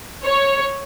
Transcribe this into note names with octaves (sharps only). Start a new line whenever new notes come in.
C#5